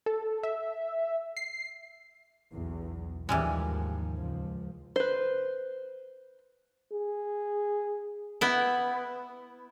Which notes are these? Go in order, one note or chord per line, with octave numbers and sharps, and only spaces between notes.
A4
E5
C7
B1 E2
D#2 G#2 E3 F3 G3 G#3
C#2 F3
B4 C5
G#4
B3 E4